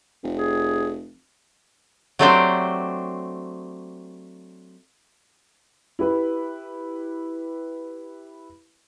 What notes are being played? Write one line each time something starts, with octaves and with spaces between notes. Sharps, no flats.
F1
G#4
F#3 A3 C4 D4 G4 C5
E4 G4 B4